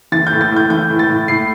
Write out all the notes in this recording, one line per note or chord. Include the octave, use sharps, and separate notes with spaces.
E3 A6
G6
A2
A6
A2
G6
E3 G6
A2
A6
A2
A2 C7